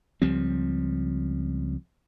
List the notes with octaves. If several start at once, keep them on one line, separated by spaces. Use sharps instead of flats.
C#2 F3 G3 C4